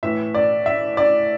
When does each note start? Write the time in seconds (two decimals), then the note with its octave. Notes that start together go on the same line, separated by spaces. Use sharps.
0.03 A2 E3 E5
0.34 D5
0.66 E5
0.97 D5